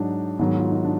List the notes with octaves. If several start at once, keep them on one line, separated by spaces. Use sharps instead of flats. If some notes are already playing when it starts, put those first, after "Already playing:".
Already playing: G#2 F#3 D4 D#4
G#2 D#3 F#3 B3
F4
D#4
D4